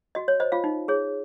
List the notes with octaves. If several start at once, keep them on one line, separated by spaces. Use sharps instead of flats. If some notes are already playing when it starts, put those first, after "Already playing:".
F#4 D#5
C#5
C5 D#5
F4 F5
D#4
G#4 C#5